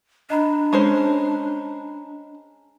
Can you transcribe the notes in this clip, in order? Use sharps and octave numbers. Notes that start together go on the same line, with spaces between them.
D4 D#5 A#5 B5
G#3 C#4 C5